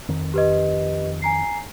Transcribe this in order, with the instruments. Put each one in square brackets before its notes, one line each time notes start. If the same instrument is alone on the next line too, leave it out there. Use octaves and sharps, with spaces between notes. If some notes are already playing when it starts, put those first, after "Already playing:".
[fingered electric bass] F2 D#3
[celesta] G4 B4 D#5
G#5 A#5 C7